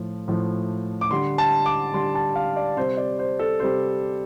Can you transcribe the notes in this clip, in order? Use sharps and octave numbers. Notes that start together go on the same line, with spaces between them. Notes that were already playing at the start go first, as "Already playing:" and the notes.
Already playing: A2 F3 A3
A2 F3 A3
D6
D3 G3 C6
A5
D6
D3 G3 C6
A5
F5
D5
C3 G3 C5
D5
C5
A4
C3 G3 C5